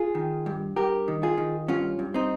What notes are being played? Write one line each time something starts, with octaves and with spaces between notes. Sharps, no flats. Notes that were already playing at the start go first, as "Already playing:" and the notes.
Already playing: F4 G#4
D#3
G2
G2 G4 A#4
D#3
F4 G#4
D#3
G2 C#4 F4
G2
C4 D#4